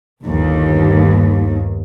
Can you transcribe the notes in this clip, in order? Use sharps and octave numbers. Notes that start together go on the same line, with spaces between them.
G1 D#2